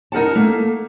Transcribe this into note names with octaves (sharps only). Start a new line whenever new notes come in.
D#4 A#4 F#5 A5
A3 A#3